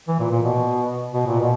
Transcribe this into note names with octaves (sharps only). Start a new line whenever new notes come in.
E3
A#2
A#2
B2
B2
A#2
B2